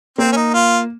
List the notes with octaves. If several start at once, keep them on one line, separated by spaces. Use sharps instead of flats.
A#3 C4
C#4
D#4
F4